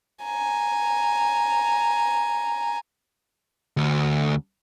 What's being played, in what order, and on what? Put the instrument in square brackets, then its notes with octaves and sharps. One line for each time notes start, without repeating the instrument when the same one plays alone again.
[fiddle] G#5 A#5
[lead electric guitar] D2